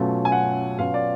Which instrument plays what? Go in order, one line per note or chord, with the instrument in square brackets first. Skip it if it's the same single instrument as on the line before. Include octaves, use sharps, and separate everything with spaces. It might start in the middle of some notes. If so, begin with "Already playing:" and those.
Already playing: [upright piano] B2 F#3 A3 C#4 F4
G#5
F#5
B2 F#3 C#4 F4 F5
D5